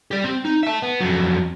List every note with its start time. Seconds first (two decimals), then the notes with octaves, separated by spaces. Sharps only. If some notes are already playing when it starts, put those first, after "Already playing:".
0.11 G4 D5
0.24 C4
0.45 D#4
0.63 E5 A5
0.82 B3
1.00 F2 F#3